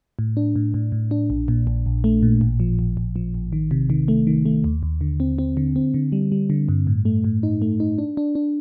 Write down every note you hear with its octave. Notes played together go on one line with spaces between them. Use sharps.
A2
D4
A2
A2
A2
D4
A#1
A#2
A#1
A#1
A3
A#2
A1
F3
A1
A1
F3
A1
D#3
C3
D#3
A3
D#3
A3
D#2
D#2
D3
C4
C4
D3
C4
D3
G3
G3
D3
G2
A2
A3
A2
D#4
A3
D#4
D4
D4
D4